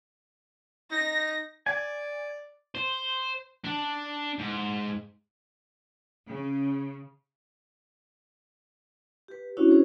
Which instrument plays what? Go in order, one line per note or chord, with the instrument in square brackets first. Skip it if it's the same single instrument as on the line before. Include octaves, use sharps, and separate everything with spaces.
[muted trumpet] D#4 [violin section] A#6
[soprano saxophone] D5 [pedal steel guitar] G#5
[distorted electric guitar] C5
D4
G#2
[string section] C#3
[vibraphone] G4 B4
C#4 D4 E4 F#4 C#5
C#4 D4 F4 G#4 C5